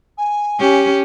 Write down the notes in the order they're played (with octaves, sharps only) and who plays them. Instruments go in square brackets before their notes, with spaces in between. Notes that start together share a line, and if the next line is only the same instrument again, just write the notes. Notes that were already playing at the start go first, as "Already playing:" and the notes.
[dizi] G#5
[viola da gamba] C#4 G4